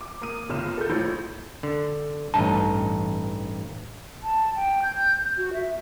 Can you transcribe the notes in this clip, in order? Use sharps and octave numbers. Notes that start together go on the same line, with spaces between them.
D6
A#3 D#6 D#7
G1 C#2 F6 E7
A4 G6
A#1 A2 F3
D3
A1 G2 D#4 A5
A5
G5
G6
F#4
E5